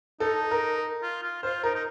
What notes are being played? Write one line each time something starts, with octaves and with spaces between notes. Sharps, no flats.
D#4 A4
A#4
F4
F4
F4 C5
D#4 A#4
D#4